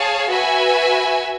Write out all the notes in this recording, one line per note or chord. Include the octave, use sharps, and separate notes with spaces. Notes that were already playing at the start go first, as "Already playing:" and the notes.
Already playing: G#4 C#5 F5 A5
F#4 B4 E5 G#5